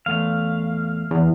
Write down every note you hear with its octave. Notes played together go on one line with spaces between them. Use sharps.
E2 A3 F5
E2